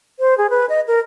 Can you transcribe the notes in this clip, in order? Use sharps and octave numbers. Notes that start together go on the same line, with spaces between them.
C5
G#4
B4
D#5
A#4